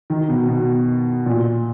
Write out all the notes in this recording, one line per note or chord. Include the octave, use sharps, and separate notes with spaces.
D#3
B2
B2
A#2